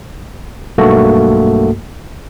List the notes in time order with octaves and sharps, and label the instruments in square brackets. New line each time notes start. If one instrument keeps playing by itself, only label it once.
[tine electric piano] B1 G2 A3 A#3 F#4 A4